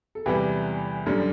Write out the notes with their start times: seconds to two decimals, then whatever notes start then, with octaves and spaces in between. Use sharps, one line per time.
0.15 A4
0.26 E2 C3 E3 G3 G4 B4
1.06 F#2 D3 G3